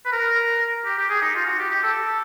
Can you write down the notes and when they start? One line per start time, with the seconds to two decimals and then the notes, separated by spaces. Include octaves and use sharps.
0.05 B4
0.12 A#4
0.85 G4
0.98 G4
1.09 G#4
1.22 D#4
1.35 F4
1.46 F#4
1.59 G4
1.71 G4
1.83 A4